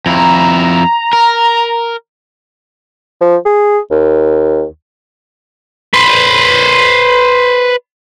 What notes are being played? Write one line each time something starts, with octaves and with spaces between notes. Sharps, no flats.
F2 E4 A#5
A#4
F3
G#4
D#2
B4 C5